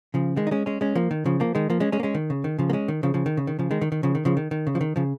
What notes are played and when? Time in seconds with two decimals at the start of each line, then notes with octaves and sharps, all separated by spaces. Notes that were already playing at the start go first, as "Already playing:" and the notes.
0.14 C#3 F3
0.36 D#3 G#3
0.47 D#4
0.51 G#3 C#4
0.66 G#3 C#4
0.81 G#3 C#4
0.95 F3 A#3
1.11 D#3
1.26 C#3 F3
1.40 F3 A#3
1.55 D#3 G#3
1.70 F3 A#3
1.80 G#3 C#4
1.92 G#3 C#4
2.00 A#3
2.03 G#3 C#4
2.15 D#3
2.30 C#3
2.44 D#3
2.59 C#3 F3
2.70 A#3
2.73 G#3 C#4
2.88 D#3
3.03 C#3 F3
3.14 C#3 F3
3.26 D#3
3.37 C#3
3.47 D#3
3.59 C#3 F3
3.71 D#3 G#3
3.81 D#3
3.92 D#3
4.03 C#3 F3
4.15 D#3
4.25 C#3 F3
4.37 D#3
4.51 D#3
4.67 C#3
4.75 F3
4.81 D#3
4.96 C#3 F3